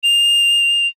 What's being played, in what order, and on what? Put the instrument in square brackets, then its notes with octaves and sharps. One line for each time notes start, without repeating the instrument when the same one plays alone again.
[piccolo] F7